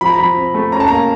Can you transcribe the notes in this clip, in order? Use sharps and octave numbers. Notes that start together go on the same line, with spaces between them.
F3 B5
A#5
F3 B5
C4
A3
C#4 A#5
A5
A#3 A#5